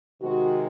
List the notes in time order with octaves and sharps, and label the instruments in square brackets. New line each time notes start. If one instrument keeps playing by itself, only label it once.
[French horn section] C3 D#3 G#3 F#4